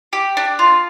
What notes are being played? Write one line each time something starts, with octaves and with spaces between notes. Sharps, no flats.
G4
D4
F4